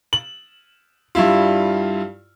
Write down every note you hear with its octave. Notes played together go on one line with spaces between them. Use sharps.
F#7
G2 G3 E4 F4